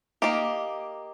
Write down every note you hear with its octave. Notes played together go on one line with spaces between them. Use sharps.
A#3 D#4 G4